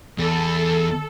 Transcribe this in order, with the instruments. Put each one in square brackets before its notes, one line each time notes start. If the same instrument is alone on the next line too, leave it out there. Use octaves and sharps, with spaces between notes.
[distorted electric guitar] E2 [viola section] A4